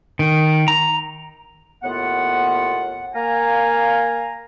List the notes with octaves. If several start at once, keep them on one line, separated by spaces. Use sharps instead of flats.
D#3
A#5
D#2 A2 B3 F4 F#5
A#3 F5 G#5 A#5